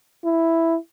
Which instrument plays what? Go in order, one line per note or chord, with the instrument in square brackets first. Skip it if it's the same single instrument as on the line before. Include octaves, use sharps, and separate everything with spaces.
[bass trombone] E4